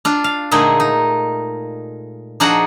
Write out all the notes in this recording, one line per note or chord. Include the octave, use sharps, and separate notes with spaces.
D4 F4
F5
A#2 D3 G#3 A3 D#4 G#4
D#4
F3 D4 D#4 F#4 G#4 F#5